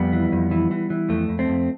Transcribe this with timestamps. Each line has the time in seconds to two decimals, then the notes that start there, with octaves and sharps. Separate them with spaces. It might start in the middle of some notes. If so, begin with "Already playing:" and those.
Already playing: F2 G3 B3
0.13 E3
0.32 F2
0.51 E3
0.71 E3
0.90 E3
1.09 F2 A3
1.29 F2
1.39 A3 C4
1.49 F2